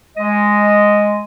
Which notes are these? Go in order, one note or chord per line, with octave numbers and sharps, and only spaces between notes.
G#3 D#5